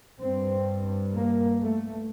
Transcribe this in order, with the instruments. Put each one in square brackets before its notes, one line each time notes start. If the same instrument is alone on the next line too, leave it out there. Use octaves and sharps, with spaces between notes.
[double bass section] G2 C4
A#3
A3